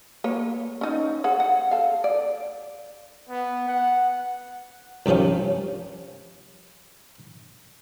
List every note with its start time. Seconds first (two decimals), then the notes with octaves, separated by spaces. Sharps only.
0.24 A#3 B4 C#5
0.81 C#4 D#4
1.24 G#4 C#5 F#5
1.40 F#5
1.71 A4 F5
2.04 D5
3.29 B3
3.68 F#5
5.06 C2 G2 D#3 F3 C#4